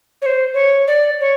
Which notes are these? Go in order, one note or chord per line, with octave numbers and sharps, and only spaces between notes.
C#5
C5
C#5
D5
C#5